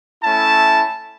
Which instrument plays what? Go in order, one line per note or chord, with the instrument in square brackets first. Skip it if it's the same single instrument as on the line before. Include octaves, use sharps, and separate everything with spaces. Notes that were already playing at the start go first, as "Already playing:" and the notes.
[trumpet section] A3 C#4 E4 A5